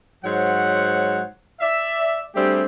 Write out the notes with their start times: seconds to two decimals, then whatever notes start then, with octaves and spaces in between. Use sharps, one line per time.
0.25 G#2 F#3 C5 C#5 F#5
1.61 D5 E5
2.35 G3 A3 C4 D4 G4 G#4